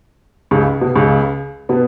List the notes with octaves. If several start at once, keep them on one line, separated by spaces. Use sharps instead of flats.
C#2 C#3
B2
C#2 C#3
B2 B3